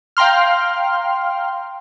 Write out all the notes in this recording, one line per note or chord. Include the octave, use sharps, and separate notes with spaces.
F5 G5 A#5 C6 F6